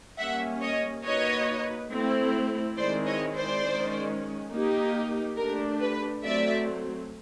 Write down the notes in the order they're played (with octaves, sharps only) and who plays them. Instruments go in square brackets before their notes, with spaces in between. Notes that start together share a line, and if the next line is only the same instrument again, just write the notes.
[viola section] G3 A#3 C#4 [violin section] E5 F#5
[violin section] C#5 D#5
[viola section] A#3 D#4 F#4 B4 [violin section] C#5 D#5
[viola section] A3 C4 E4
[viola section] D#3 G#3 C4 E4 [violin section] C5 D5
[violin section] C#5 D#5
C5 D5
[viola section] D#3 G#3 C#4
A#3 D#4 G4
[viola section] A3 D4 G4 [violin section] A#4
[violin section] B4
[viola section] F#3 A3 C4 [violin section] D5 E5